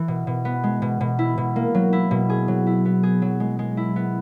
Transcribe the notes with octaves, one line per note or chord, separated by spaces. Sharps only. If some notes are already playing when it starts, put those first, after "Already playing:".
Already playing: E3
B2
B2
B3
G#3
B2
B2
E4
B2
A#3
F#3
E4
B2
G#4
F#3
E4
B3
G#4
F#3
G#3
G#3
E4
B3